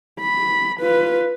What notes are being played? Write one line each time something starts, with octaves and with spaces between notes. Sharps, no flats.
B5
F4 B4